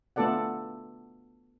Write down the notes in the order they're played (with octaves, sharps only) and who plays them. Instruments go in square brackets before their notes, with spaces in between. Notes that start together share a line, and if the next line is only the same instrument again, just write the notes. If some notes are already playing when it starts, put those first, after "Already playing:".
[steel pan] A3 B3 F4 A4 D5 F#5